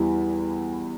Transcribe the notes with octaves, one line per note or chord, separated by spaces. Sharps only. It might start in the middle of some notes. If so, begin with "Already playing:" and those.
Already playing: E2 E3 G3 E4